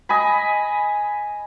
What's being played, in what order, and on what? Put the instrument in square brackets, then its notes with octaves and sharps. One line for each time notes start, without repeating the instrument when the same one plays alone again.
[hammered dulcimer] D#5 G#5 B5